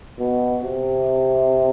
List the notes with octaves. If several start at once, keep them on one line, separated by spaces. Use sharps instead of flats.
B2
C3